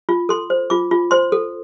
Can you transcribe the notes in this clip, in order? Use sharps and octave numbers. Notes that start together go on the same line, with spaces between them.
F4
A4 C6
C5
F4 D6
F4
C5 C6
A4